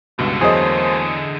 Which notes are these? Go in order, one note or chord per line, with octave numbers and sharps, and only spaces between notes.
C#2 G2 B2 D3 E3
E2 F#3 A3 A#3 G#4 C5 D#5 D#6